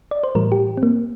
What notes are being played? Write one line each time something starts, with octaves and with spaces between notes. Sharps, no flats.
D5
C5
A2 E3 G3 A#4
G4
C4
A#3